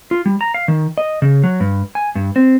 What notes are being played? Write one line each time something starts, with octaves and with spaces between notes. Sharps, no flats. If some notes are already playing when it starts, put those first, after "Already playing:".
F4
G3
A#5
F5
D#3
D#5
C#3
F#3
G2
G#5
G2
C4